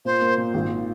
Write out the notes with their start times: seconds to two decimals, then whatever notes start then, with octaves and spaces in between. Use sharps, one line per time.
0.05 A#2 C5
0.21 A#3
0.37 A#2
0.54 G#1